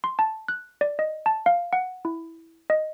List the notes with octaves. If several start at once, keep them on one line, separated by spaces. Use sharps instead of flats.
C6
A5
F#6
D5
D#5
A5
F5
F#5
E4
D#5